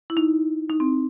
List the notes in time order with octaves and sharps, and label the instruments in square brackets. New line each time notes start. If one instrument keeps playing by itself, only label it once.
[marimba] E4
D#4
D#4
C4